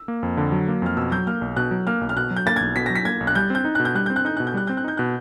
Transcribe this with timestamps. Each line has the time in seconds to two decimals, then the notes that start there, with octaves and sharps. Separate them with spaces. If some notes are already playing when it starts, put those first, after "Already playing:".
Already playing: E6
0.08 A#3
0.23 F2
0.37 D3
0.52 F#3
0.68 A#3
0.82 F2 F6
0.97 B2 E6
1.12 F#3 G6
1.27 A#3 F6
1.41 B1
1.57 B2 F#6
1.71 F#3
1.87 A#3 F6
2.01 B1
2.09 F6
2.16 B2 F#6
2.31 F#3
2.36 G6
2.46 A#3 A6
2.56 B1 G#6
2.76 B2 B6
2.86 F#3 A#6
2.95 B6
3.05 A#3 G#6
3.21 B1
3.27 F#6
3.35 G3 G6
3.50 C4 G6
3.65 D#4
3.75 B2 F#6
3.85 G6
3.95 G3 F#6
4.06 C4 G6
4.16 F#6
4.25 D#4 G6
4.37 B2 F#6
4.47 G6
4.54 G3 F#6
4.67 C4 G6
4.77 F#6
4.84 D#4 G6
4.97 B2 F#6